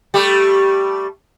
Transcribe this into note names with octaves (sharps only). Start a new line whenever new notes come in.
G3 A3 G4